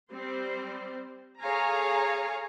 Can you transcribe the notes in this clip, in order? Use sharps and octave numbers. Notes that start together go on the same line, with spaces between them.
G3 C4 C5
G#4 A4 C#5 F5 G#5 A#5